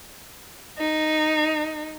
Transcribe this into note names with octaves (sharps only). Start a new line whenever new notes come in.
D#4